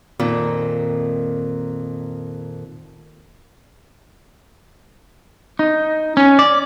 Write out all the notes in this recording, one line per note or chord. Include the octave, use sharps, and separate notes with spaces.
F2 A#2 D#3
D#4
C#4
D5